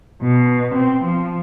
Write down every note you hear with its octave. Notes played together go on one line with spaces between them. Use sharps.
B2
C4
F3